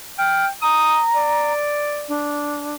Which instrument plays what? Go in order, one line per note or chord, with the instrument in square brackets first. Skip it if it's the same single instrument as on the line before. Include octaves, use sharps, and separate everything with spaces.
[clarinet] G5 [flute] F6
[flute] A#5 [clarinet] D#6
[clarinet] D5
[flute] D4